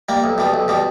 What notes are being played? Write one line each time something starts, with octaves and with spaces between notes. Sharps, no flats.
G3 A#3
B1
B2 G3
B1
B2 G3